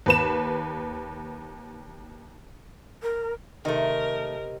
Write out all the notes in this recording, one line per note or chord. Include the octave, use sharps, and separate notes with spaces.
D#2 B4 E7
A#4
C3 D#3 A3 A#4 D#5 G5